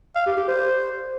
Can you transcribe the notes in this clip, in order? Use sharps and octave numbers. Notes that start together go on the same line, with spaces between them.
F5
G4
G4
C5